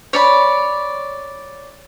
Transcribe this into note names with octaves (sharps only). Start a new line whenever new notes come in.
C#5 D5 B5